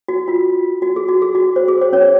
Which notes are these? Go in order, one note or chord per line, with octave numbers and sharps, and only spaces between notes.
F#4
F4
F#4
G#4
F#4
G#4
F#4
C5
G#4
C5
C#4 C#5